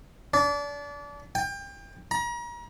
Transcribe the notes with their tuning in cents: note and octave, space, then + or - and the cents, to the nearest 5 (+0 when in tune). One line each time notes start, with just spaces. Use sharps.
D4 -30
G5 +30
A#5 +40